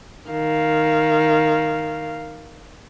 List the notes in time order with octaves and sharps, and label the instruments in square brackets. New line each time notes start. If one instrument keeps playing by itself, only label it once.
[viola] D#3 F5